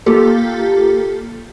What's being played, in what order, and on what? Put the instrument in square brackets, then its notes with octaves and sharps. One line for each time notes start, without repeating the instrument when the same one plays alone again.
[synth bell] A#3 F4 G4 A4